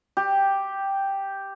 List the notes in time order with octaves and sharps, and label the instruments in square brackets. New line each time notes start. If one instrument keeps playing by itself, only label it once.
[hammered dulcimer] G4